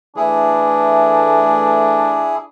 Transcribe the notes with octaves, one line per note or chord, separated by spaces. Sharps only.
E3 A3 D4 E4 G#4